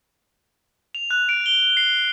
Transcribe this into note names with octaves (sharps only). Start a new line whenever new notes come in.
F7
F#6
D7
G7
C7